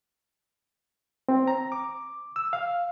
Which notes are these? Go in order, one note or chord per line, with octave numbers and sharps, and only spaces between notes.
C4
A#5
D6
E6
F5